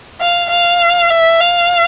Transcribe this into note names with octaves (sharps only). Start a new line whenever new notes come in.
F5
F5
E5
F5